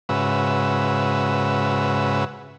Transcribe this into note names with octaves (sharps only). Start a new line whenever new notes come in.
G#2 C#3 F#4 B4 E5